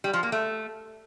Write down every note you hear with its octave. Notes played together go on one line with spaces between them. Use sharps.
G3
F3
A#3
A3